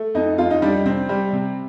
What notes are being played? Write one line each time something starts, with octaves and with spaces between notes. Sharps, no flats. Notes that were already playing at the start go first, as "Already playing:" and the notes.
Already playing: A3
F2 D#4
F2 F4
D#4
G3 D4
C3 C4
G3
C3